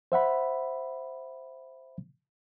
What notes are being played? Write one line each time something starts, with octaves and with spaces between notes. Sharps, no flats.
C5 E5 F#5 B5